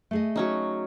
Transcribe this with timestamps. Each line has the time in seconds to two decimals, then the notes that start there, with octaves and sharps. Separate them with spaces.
0.11 A3 G#4 D#5
0.36 F#3 C#4 D#4